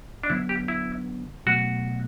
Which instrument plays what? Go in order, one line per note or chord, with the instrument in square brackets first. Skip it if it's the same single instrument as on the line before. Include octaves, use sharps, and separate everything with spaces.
[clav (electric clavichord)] D4
[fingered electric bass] D3 F#3 B3 [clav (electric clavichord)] E4
[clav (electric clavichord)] G4
E4
[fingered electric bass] B2 F#3 A3 [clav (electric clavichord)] F#4